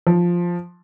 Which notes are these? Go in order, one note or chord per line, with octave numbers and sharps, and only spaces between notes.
F3